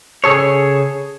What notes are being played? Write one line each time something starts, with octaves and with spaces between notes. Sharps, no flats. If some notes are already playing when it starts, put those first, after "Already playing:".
C#3 G#4 A4 C#5